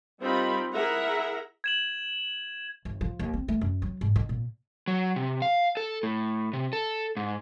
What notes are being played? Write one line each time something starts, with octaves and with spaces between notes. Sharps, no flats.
G3 C4 D#4 F4 A#4 B5
E4 G#4 A#4 E5 F#5 A#5
G#6 E7 F#7
G1
F3
D#2
C4
A3
F#2
F#3
G#2
D#3
A#2
F#3
C3
F5
A4
A2
C3
A4
G#2